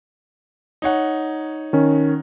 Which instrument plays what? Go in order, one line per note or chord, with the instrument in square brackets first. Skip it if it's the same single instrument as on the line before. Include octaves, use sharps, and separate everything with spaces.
[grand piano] D#4 C#5 F#5
[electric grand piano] D#3 C#4